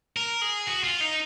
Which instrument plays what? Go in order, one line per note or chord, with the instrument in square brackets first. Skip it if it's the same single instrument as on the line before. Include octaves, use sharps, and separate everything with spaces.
[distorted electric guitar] A#4
G#4
F#4
F4
D#4